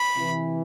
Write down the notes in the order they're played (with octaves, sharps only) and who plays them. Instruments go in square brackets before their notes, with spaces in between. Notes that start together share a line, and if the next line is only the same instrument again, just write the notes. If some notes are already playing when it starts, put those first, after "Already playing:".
Already playing: [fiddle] B5
[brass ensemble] C3 E3